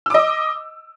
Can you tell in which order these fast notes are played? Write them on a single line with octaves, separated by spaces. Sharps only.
E6 D6 D#5